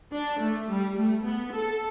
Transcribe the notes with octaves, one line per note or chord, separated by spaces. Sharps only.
D4
A3
G3
A3
B3
A4